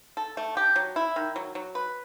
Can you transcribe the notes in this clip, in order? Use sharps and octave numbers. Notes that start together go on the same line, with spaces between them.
A4
A3
G4
F#3
E4
D#3
F#3
F#3
B4